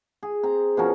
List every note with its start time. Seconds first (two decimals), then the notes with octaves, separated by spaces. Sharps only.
0.23 G#4
0.43 C4 A#5
0.77 B2 F3 C#4 A#4